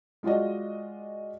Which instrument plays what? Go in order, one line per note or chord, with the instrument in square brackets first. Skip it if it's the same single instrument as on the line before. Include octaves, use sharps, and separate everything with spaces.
[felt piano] G#3 F4 F#4 D5 D#5